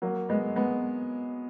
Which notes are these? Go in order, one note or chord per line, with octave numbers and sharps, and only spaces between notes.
F#3 A#3
G#3 B3
G#3 B3